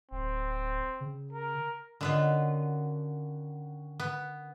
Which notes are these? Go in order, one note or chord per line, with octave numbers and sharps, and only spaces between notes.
D1 C4
C#3
A#4
D3 D#3 B3 C#4 F4 F#4
B3